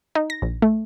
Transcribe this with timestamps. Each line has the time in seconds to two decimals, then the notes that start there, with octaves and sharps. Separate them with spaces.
0.15 D#4
0.30 A#6
0.42 A#1
0.62 A3